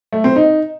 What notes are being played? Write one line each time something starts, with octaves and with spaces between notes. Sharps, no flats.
A3
C4
D#4